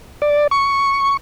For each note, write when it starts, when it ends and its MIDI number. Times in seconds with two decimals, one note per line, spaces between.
0.22 0.47 74
0.51 1.17 85